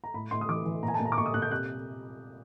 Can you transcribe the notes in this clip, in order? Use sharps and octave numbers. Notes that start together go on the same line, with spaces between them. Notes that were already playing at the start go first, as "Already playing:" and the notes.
A#5
A2 B5
A2 C6
D#6
E3 D6
E3
A#2 A#5
G#5
A5
A#2
A#5
D6
A#2 C#6
D#6
A#2 F#6
G6
C3 F#6